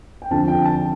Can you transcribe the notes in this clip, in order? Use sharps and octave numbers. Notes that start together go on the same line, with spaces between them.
G5
F2 D3 F3 A5
G5
A5